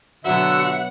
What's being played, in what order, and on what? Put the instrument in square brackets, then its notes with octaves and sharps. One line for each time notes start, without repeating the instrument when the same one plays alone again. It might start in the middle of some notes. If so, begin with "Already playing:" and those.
[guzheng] B2 F#3 E4 [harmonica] D3 E5 [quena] F#4 [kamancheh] F#5